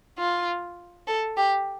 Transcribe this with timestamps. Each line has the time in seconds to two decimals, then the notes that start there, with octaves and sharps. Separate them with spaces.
0.19 F4
1.08 A4
1.37 G4